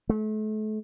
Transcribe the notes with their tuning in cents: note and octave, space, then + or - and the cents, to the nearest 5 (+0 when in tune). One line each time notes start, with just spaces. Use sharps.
A3 -35